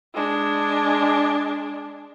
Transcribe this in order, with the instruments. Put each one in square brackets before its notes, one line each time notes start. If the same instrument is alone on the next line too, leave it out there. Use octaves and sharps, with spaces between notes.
[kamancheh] G#3 D4